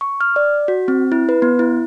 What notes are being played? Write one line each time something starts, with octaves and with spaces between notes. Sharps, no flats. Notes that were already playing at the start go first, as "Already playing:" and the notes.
C#6
F6
D5
F#4
C4
E4
B4
B3
E4